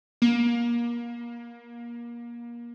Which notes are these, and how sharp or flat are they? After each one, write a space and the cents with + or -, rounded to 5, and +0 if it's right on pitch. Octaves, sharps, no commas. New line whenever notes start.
A#3 +25